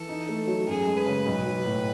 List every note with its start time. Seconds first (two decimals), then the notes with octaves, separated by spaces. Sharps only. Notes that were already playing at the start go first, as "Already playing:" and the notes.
Already playing: E3 A4
0.09 D#4
0.29 A3
0.47 F#3
0.67 F#2 G#4
0.87 G#3
0.97 B4
1.06 C#3
1.26 B1
1.45 F#3
1.65 A2